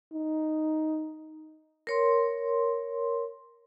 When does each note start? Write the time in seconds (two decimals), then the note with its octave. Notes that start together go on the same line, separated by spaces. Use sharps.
0.13 D#4
1.87 A#4 C#5 C6